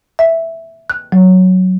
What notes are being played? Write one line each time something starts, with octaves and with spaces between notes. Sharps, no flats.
E5
F#6
F#3